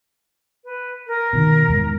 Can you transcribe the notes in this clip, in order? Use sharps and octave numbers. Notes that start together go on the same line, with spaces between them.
B4
A#4
B2 D#3
E2 G#2